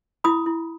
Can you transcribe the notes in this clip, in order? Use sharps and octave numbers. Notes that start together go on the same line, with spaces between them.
E4 B5 D#6
E4